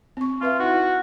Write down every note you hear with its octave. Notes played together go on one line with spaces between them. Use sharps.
C4 C#6
C4 F4 B4 E5
D#4 E4 F#4